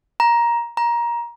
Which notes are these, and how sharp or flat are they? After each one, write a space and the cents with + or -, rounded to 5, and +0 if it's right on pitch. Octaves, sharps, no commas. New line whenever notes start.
A#5 +15
A#5 +20